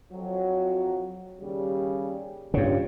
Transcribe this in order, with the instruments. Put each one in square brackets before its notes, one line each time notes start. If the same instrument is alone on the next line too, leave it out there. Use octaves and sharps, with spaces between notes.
[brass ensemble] F2 F#3
D#2 C#3 G3
[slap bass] G2 C#3 [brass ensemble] D4 F4